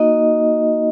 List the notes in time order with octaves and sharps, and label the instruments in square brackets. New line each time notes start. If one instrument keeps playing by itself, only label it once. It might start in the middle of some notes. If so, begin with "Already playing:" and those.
Already playing: [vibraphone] A#3 D#4 F#4 D#5